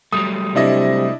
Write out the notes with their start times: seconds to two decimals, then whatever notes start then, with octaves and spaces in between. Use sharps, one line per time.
0.13 F#3 G3 A3 D#6
0.56 C3 D4 E4 D#5